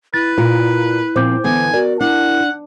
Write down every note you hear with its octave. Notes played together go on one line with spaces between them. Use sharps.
E4 B4 A6
A#2 F4 A#4
A#2 F3 C4 C5 D6 G6
D3 E3 B3 G#5
F#4 A#4 D5
D4 E4 F#5